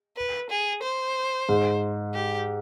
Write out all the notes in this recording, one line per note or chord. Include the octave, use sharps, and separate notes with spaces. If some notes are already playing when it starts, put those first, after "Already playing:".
B4
G#4
C5
G#2
G4